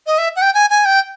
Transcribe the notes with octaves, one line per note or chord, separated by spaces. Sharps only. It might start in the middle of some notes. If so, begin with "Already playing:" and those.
D#5
E5
F#5
G5
G#5
G#5
G5